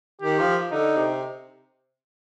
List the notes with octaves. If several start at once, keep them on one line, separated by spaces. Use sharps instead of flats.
D#3 G4
F3
D3 D#4
C3